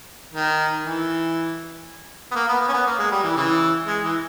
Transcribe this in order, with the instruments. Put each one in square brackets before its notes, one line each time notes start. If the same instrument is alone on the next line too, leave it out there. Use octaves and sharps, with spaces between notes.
[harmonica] D#3
E3
B3
A#3
B3
B3
C#4
B3
A#3
G#3
G3
E3
C#3 E3
G#3
E3